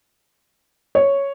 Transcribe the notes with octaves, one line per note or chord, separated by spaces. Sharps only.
C#5